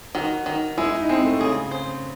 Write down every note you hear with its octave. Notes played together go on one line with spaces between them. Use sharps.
D#3 F#4
D#3
G#3 E4
D#4
G#3 C4
A3
C#3 G#4
C5